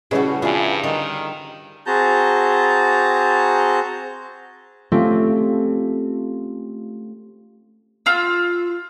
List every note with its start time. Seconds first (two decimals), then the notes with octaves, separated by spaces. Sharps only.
0.11 C#3 G3 E4 F#4 G#4 A4 B4 C#5
0.42 G2 F3 D4 F4 G#4 E5 G#5
0.83 D3 D#3 G3 A#4 D#5
1.86 C4 F#4 G#4 A5 A#5 G6
4.92 A3 C4 C#4 F4 G4
8.06 F4 E6